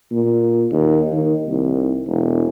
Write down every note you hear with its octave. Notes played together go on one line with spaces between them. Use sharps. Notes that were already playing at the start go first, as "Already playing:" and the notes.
A#2
D#2
D#3
C2
E1